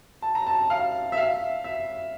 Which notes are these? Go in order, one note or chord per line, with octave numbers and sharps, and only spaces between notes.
A5
A#5
A5
F5
E5
F5
E5